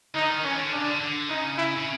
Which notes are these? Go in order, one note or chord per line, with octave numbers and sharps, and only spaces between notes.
D3 D#4
D#3
E3 C#4
D3
C#3 D4
D3
D3
C#3 D#4
E4
C#3